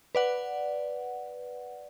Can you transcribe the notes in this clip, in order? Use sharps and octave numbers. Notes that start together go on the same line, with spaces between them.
B4 D5 F#5